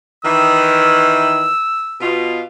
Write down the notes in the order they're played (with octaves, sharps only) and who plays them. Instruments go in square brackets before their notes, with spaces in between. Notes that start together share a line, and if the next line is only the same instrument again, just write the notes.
[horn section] D#3 E3 [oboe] E6
[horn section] B2 F4